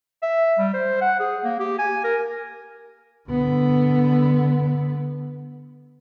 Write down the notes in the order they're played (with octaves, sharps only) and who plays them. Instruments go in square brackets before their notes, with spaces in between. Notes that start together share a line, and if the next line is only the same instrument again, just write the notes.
[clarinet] E5
G3
C5
F#5
G#4
A#3
G4
G#5
A#4
[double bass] D3 B3